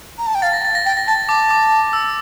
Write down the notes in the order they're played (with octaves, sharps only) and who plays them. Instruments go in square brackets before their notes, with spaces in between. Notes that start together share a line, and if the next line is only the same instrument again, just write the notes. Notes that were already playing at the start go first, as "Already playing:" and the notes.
[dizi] A#5
A5
G5
[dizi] F5 [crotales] A6
[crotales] A#6
A6
A#6
[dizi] G5 [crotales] A6
[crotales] A#6
[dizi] A5 [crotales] A6
[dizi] A5 [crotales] D6
[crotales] D6
E6